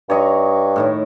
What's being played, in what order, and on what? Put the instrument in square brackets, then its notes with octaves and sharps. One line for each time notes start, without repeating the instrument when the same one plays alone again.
[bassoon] G2 [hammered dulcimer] C#5 D#5 C#6
[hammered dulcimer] A2 D#3 E4